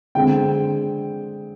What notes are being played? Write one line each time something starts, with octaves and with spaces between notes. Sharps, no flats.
D3 G#3 C4 G5